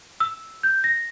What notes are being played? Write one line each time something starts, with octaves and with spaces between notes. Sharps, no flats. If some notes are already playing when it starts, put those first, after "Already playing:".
E6
G6
A#6